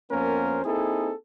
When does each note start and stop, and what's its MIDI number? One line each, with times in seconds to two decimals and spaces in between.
0.11 0.60 41
0.11 0.60 58
0.11 0.60 59
0.11 0.60 61
0.11 0.60 70
0.11 0.60 72
0.65 1.12 58
0.65 1.12 60
0.65 1.12 63
0.65 1.12 64
0.65 1.12 68
0.65 1.12 69